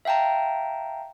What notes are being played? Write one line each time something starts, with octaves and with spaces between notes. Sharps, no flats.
E5 F5 G5 A5 A#5